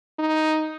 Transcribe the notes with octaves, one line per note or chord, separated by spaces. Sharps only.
D#4